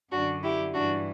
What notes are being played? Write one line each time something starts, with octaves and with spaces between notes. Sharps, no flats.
F#2 D3 D4 F#4
E4 G4
G2 E3 D4 F#4